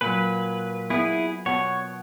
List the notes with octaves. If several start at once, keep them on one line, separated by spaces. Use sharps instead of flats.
A#2 F#3 B4
B3 E4 G#4 B4
B2 C#5 F#5